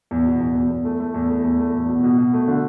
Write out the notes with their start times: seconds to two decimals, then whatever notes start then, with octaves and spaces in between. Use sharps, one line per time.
0.11 E2
0.26 B2
0.41 E2
0.55 E2
0.70 E2
0.85 A3
1.00 A3
1.14 E2
1.29 A3
1.44 E2
1.59 A3
1.74 E2
1.89 B2
2.04 B2
2.18 B2
2.33 A3
2.48 D3